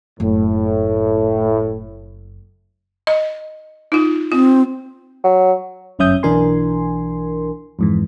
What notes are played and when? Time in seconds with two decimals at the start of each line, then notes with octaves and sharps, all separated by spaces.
0.20 F#1 A2
3.07 D#5
3.92 D#4 F4
4.32 C4 F4
5.24 F#3
5.99 G1 F#2 C#4 E5 D#6 G6
6.23 B1 E3 D4 A#4 G#5 C6
7.79 F2 G#2 E3